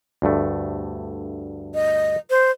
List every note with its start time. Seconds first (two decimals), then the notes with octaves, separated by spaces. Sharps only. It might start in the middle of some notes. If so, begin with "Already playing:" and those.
0.22 D2 G2 A3
1.74 D#5
2.30 C5